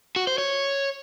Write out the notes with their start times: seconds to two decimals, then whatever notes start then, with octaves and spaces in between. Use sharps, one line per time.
0.16 F#4
0.27 C5
0.38 C#5